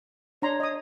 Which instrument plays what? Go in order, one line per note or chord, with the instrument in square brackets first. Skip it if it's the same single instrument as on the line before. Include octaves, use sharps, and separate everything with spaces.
[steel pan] D4 A#5 C6 [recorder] C#5
[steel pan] D#5 D#6